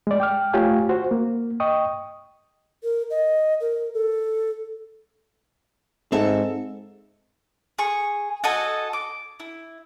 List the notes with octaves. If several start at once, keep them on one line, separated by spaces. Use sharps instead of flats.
G#3 D5
G5 D6 F6
A3 F4 G4 C#5 F5 G#5
F#4 C5
A#3
D#5 G5 C#6 D#6
A#4
D#5
A#4
A4
G#2 C4 A4 E5
G#4 C#6
F#4 A4 D#5 G#5
D6
E4